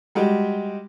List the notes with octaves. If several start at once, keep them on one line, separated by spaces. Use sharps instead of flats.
G3 G#3 F#4 G4